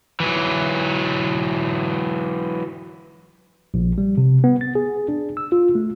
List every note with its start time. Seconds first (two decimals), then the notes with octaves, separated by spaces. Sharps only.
0.20 E3 F#3
3.74 A#1
3.98 G3
4.18 C3
4.44 B3
4.61 A6
4.75 G#4
5.08 D4
5.37 E6
5.52 F4
5.75 A3